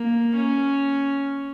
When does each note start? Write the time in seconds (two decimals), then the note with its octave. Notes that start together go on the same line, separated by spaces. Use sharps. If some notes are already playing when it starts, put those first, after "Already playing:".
Already playing: A#3
0.35 C#4